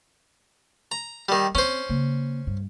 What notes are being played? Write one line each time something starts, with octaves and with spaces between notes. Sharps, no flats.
A#5
D#3 G3
C4 C#4 C5
C#3 A#3
G2